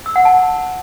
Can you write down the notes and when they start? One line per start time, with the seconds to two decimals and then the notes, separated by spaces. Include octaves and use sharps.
0.06 E6
0.16 F#5
0.25 A5